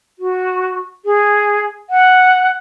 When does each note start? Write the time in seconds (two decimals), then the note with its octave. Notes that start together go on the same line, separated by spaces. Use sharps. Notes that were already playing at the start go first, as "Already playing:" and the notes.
0.19 F#4
1.05 G#4
1.90 F#5